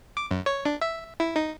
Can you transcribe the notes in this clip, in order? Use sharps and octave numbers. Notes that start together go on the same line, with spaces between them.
D6
F#2
C#5
D4
E5
E4
D#4